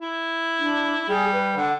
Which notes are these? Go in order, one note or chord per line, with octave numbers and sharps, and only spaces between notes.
E4
D4
G3 G#4
B4
D3 F#5